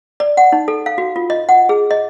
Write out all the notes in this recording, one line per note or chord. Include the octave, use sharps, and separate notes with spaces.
D5
F#5
D#4
A4
F5
F#4
F4
D#5
F#5
G#4
D#5